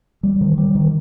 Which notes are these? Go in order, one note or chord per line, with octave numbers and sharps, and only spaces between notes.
G3
D#3
G3
D#3